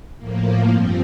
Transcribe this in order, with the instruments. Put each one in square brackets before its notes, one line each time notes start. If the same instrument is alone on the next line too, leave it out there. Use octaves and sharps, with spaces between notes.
[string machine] A2 F3 A#3
G2 F3 C4